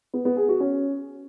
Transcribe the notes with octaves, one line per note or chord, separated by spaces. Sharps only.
B3
B3
G#4
F#4
C#4